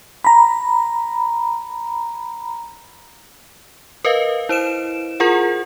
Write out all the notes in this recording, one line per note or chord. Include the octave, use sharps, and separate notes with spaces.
A#5 B5
A#4 B4 D#5 F5
E4 C5 D7 E7
F4 G#4 A#4 F#5